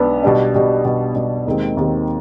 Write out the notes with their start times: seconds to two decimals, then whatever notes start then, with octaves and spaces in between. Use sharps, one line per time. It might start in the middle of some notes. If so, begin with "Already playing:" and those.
Already playing: B1 G#3 B3 D4
0.23 B2 G3 D4
0.53 B2 G3 D4
0.85 B2 G3 D4
1.15 B2 G3 D4
1.46 D#2 D#3 G#3 C4
1.77 D#2 D#3 G#3 C4